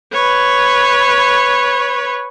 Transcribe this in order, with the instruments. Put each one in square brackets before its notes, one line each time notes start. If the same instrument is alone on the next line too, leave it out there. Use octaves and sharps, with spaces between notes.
[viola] B4 C#5